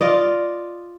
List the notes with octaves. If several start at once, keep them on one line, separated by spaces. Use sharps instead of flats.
F4 D5 D#5